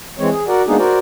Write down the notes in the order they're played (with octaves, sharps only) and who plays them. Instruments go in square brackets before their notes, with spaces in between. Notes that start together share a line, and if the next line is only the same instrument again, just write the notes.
[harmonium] E3 G#3 C4 C#5
G#4
F#4 A#4 D5 F#5
G#3 A#3 B3 D4 D#4 G#4
F#4 A#4 C5 D5